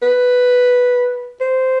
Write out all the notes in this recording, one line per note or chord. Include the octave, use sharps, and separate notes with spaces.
B4
C5